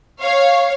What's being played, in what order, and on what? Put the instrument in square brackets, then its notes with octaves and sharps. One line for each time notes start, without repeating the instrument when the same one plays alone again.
[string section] C#5 F5